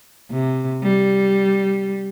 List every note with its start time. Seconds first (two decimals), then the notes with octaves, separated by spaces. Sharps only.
0.31 C3
0.83 G3